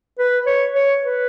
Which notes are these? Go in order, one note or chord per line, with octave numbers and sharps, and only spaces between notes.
B4
C#5
C#5
B4